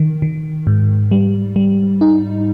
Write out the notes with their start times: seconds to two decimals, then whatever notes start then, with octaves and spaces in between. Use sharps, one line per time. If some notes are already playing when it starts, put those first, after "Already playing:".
Already playing: D#3
0.22 D#3
0.67 G#2
1.11 G3
1.56 G3
2.01 D#4